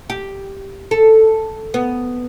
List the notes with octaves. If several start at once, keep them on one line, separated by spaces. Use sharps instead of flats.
G4
A4
B3